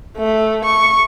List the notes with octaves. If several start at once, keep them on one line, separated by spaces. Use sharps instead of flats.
A3
C#6